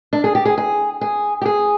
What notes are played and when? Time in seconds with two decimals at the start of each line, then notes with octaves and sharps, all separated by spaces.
0.13 D4
0.24 G#4
0.35 G4
0.45 G#4
0.58 G#4
1.01 G#4
1.42 G4
1.46 G#4